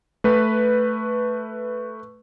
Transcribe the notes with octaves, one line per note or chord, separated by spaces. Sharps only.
A3 B4